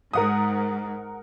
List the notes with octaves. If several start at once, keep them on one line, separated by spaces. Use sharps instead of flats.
G#2 A#4 F#5 D#6